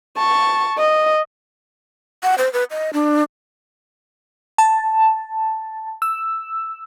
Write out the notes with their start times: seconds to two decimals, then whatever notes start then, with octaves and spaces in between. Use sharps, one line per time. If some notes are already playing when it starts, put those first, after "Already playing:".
0.17 A5 C#6
0.78 D#5
2.23 F#5
2.38 C5
2.53 B4
2.71 D#5
2.93 D4
4.58 A5
6.02 E6